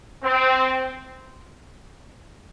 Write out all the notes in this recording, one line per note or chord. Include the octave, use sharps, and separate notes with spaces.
C4